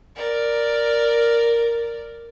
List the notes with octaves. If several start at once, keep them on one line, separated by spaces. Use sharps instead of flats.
A#4 D5